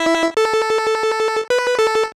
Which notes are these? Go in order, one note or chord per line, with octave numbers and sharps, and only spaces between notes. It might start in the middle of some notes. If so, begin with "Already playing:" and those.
Already playing: E4 E5
A4
B4
A4